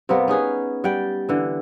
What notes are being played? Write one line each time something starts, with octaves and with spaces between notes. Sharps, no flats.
C3 G3 A#3 B3
C#4 D#4 G#4 B4
G3 F#5 G5
D3 E3